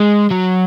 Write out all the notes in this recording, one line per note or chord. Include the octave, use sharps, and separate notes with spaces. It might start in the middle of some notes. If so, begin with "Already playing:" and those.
Already playing: G#3
F#3